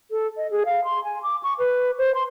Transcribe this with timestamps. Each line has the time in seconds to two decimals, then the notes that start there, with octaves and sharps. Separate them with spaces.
0.11 A4
0.37 D#5
0.51 G#4
0.66 F5
0.85 C6
1.04 G#5
1.23 D6
1.43 C#6
1.59 B4
1.98 C5
2.15 C6